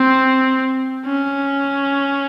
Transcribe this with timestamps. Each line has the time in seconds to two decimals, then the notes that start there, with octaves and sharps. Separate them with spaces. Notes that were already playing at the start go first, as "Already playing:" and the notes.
Already playing: C4
1.05 C#4